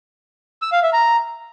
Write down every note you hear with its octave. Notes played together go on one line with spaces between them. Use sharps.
E6
F5
E5
A#5